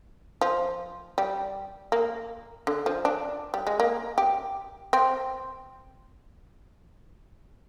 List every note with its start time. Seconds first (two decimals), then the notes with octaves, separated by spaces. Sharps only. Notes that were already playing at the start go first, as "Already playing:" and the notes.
0.41 F3
1.18 G3
1.92 A#3
2.67 D3
2.86 F3
3.05 D4
3.54 G3
3.67 G#3
3.80 A#3
4.18 G4
4.93 C4